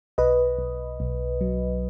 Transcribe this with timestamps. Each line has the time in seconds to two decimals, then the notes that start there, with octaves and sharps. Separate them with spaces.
0.18 B1 B4 D#5
0.58 B1
1.00 B1
1.41 F#3